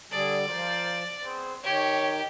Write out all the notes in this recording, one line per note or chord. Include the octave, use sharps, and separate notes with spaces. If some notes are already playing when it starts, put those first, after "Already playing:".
D3 G3 G#4 A4 D5
F3 F4 A#4 C5
B3 C4 G#4 C5
D#3 G4 C#5